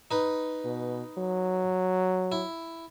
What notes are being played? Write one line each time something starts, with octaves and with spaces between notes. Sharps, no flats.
D#4 B4
B2
F#3
E4